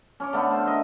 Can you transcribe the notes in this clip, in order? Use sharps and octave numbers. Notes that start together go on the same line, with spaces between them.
C#4 C#5 D6
D3 A3 B3
C5
A#4 D#5 E5